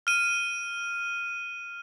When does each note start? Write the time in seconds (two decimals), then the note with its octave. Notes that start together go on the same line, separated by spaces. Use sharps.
0.07 F6 D#7